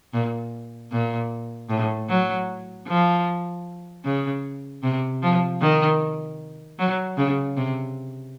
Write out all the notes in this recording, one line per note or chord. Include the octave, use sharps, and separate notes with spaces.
A#2
A#2
A2
F#3
F3
C#3
C3
F3
D#3
F#3
C#3
C3